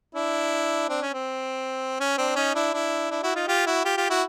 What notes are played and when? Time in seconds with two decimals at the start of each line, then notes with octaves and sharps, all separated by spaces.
0.15 D4 E4
0.89 C4 D4
1.02 C#4
1.14 C4
2.00 C#4
2.18 C4 D4
2.36 C#4 D#4
2.55 D4 E4
2.73 D4 E4
3.10 D4 E4
3.23 E4 F#4
3.35 D#4 F4
3.48 F4 G4
3.66 E4 F#4
3.85 F4 G4
3.97 F4 G4
4.10 E4 F#4